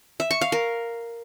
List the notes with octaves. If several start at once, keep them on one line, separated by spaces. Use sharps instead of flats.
E5
C#6
F5
A#4